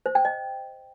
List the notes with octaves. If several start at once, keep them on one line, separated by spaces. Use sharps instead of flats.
C5
G5
D#5